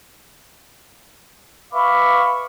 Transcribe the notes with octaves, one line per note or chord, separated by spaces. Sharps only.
B4 E5 F5 B5 C#6 D6